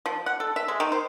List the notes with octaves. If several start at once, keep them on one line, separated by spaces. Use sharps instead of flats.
F3
F#5
A4
E5
G#3
D#3
C5